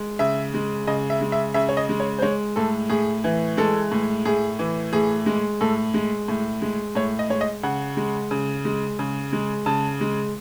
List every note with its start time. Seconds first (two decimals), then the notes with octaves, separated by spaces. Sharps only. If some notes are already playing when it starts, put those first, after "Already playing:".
Already playing: G#3
0.19 C#3 E5
0.54 G#3
0.87 C#3 D#5
1.10 E5
1.21 G#3
1.32 E5
1.54 C#3 E5
1.69 C#5
1.77 D#5
1.89 G#3
2.00 C#5
2.19 C5
2.22 G#3 C#5
2.56 A2 A4
2.90 A2 G#4
3.24 E3
3.57 G#3 A4
3.92 A2
4.25 A2 G#4
4.59 E3
4.93 A2 G#4
5.26 G#3
5.61 A2 A4
5.94 G#3
6.28 A2
6.62 G#3
6.95 A2 C#5
7.19 D#5
7.30 G#3 C#5
7.41 D#5
7.63 C#3 F#5
7.97 G#3
8.31 C#3
8.65 G#3
8.99 C#3
9.33 G#3
9.66 C#3 A5
10.01 G#3